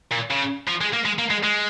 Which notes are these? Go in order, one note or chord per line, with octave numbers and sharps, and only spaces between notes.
A#2
C#3
F3
G#3
A#3
G#3
A#3
G#3
G#3